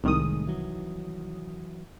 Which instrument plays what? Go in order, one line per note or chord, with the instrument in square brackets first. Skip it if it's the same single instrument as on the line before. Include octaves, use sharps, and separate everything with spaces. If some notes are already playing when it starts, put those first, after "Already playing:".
[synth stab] C2 D#3 D#6 [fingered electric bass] A2 G#3
[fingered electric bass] E3 F#3